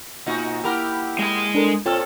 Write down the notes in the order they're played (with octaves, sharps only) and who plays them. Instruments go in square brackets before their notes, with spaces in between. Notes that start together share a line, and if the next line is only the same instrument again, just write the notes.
[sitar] B2 D#4 F#4 [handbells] A#3 F4 G#5
[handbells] A#3 E4 F6 [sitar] G4 A#4 [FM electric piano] F#5 B5 E6
[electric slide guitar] G#3 D#5
[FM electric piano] D4 A4 A#4
[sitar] A#2 C4 A4 [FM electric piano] F4 F6 [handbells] C#5 E6